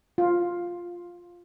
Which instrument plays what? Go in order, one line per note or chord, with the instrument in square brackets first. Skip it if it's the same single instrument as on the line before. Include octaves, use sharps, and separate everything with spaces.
[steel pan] F4